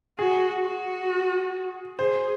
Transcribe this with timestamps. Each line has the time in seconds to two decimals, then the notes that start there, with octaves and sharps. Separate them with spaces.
0.19 F#4 G#4
0.64 F#4
1.99 G#4 C5